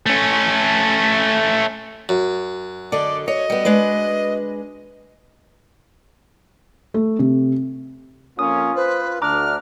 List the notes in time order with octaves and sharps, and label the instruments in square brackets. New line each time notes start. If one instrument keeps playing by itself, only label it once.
[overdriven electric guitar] A3 C#4
[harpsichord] F#2
[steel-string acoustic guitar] D3 A4 D#5 [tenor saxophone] D5
[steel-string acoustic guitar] C#5 [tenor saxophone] D#5
[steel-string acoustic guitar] G3 B3
G#3 D4 B4
[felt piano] A3
C3
[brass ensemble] F2 A#3 C#4 [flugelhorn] F4 [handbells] D#6
[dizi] B4 [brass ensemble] C5
[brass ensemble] D2 [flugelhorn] D4 [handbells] A#5 D6 F#6 [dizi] F6